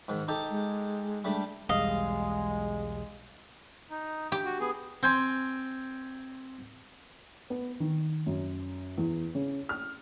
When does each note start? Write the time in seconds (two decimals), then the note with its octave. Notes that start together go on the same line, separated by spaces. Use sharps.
0.08 G#2 D#3
0.28 D#4 G4 A4
0.50 G#3
1.24 G3 A3 D4
1.69 B1 E2 G3 G#3 D#5 F5
3.90 D#4
4.32 G4
4.45 F#4
4.60 B3 G#4
5.03 C4 G5 G#5 C6
7.50 B3
7.80 D#3
8.26 F#2
8.98 E2
9.35 C#3
9.69 F6